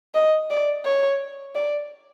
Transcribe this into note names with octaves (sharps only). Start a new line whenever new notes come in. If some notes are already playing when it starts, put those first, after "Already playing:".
D#5
D5
C#5
D5